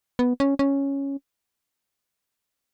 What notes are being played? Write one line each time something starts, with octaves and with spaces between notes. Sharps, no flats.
B3
C#4
C#4